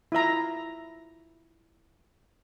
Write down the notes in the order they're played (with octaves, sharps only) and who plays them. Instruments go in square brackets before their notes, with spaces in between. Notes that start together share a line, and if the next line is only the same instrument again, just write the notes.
[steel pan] E4 F4 E5 A#5